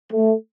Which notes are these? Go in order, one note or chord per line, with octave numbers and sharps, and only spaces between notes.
A3